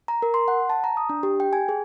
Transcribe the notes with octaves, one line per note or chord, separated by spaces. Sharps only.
A#5
A#4
C6
F#5
A5
A#5
D#6
D4
G4
G5
G#5
G#4